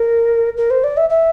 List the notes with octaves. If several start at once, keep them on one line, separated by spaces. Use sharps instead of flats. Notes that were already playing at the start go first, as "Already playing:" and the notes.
Already playing: A#4
A#4
C5
D5
E5
E5